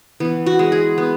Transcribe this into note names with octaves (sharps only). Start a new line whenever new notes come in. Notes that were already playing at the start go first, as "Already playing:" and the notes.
E3 B3
F#4
G#3
G#4
B3